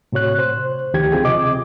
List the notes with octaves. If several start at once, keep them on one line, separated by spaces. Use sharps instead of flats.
A2 C3 F#4 C#5 F#6
C5
D2 D#3 F3 G4 G#6
C4 F4 G#4 G5
C3 D#5 D6